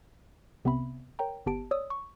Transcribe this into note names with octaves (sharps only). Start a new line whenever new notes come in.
C2 C3 B3 C4 E5 B5
A#4 C#5 G5 A#5
G1 B3 G4 A5 D7
C#5 D5 D#6 E6
C#6